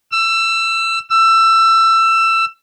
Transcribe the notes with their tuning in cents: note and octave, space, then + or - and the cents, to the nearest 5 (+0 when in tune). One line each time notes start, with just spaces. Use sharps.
E6 +25
E6 +20